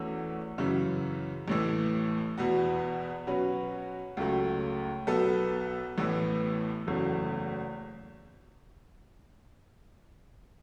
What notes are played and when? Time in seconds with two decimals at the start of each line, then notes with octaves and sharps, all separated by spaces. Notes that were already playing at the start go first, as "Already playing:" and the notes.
Already playing: E2 E3 A3 C#4 F#4
0.58 F#2 C#3 E3
1.48 A1 A2 E3
2.38 E2 B2 B3 F#4
3.27 B2 F#3 C#4 F#4 B4
4.17 C#2 C#3 F#3 A3
5.07 B1 B2 B3 A4
5.98 A1 A2 E3 B3
6.87 F#1 E2 C#3 F#3 A3